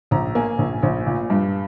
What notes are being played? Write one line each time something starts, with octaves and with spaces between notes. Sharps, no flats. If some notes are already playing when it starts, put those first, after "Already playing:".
A#1 A#5
A#3 G#5
A#1
A#1
A#2
G2